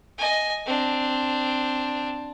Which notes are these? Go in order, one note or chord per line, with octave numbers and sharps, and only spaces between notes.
D#5 G#5
C4 D4